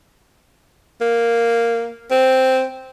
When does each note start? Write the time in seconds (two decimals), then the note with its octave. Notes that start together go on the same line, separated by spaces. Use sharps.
1.01 A#3
2.11 C4